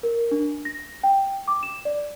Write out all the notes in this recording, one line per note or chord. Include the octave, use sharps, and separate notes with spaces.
A#4
D4
A#6
G5
D6
E7
D5